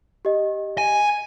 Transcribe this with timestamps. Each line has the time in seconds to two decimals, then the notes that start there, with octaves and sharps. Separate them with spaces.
0.25 G4 D#5
0.78 G#5